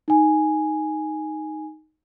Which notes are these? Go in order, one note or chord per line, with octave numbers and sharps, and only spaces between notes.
D#4 G#5